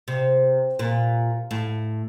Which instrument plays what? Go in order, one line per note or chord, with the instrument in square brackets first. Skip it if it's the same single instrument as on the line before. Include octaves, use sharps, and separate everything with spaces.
[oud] C3
A#2
A2